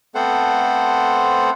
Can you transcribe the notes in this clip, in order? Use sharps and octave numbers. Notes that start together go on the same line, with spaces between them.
A3 B3 C4 A4 C5 F#5